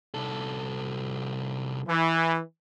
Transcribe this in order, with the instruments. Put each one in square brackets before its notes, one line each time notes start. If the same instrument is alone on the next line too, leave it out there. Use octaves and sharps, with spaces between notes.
[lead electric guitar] C2 A4
[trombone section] E3